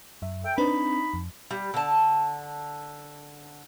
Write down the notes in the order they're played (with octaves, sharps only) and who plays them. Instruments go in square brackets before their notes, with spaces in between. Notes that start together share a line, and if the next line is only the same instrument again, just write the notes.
[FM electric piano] F#2 E5
[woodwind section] A4 G5 [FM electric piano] E5
[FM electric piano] C4 D4 B4 [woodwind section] D#4 B5
[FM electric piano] F2
[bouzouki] G3
D3 A5